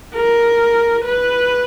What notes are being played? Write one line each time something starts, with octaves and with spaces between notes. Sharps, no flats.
A#4
B4